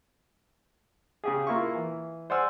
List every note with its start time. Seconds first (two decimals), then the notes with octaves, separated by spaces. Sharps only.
1.24 C#3 G4 G#4
1.47 A#3 E4 F4 C#6
1.75 E3
2.30 C5 D5 F#5 G#5 E6 F6